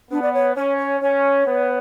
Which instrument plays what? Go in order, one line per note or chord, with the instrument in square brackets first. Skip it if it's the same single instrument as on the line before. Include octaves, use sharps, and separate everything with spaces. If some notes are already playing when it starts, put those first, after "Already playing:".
[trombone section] B3 [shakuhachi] D4
[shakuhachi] D5
C#5
[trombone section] C#4 [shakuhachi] C#5
[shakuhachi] C#5
[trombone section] C#4 [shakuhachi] C#5
[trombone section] B3